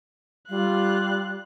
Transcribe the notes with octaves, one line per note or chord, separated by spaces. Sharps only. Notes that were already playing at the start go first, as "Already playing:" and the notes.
G3 F4 F#6